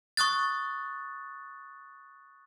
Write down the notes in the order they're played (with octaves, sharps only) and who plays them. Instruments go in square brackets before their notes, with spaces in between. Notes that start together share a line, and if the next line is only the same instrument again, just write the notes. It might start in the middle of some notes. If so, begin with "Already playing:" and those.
[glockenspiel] C#6 D#6 F#6 A6